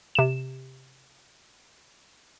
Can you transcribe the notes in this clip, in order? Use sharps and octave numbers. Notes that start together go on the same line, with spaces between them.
C3 E7